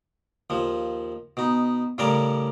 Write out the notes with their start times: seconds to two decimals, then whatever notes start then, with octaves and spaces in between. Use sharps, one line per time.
0.50 D#2 F3
1.37 B2 D#4
1.98 A2 C#3 G3 C#4 A#4 D5